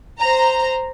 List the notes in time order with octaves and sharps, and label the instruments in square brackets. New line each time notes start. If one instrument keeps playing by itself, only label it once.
[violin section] C5 A#5